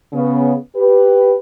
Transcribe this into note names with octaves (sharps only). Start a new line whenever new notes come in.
C#3 B3
G4 B4